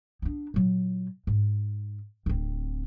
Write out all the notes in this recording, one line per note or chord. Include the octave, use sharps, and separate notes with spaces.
B3 D4
A#2 F#3
G#2
D1 C4